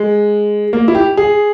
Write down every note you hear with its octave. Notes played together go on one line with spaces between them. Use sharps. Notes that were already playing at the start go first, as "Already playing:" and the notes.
Already playing: G#3
A#3
E4
G4
G#4